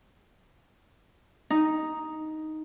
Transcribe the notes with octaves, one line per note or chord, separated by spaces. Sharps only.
D#4